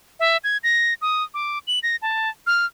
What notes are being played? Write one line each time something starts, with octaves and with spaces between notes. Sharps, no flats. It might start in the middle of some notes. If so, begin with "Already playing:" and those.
E5
G#6
A#6
D#6
D6
F#7
A#6
A5
F6